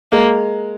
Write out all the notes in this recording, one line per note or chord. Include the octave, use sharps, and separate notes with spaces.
G#3 A#3